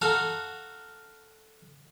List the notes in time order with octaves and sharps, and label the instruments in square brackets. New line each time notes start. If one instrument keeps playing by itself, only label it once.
[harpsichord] F#4 A4 F5 A#5